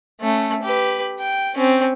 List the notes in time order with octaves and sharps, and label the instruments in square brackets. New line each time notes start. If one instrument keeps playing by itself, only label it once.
[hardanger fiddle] A3 C#4
G4 B4
G5
C4 C#4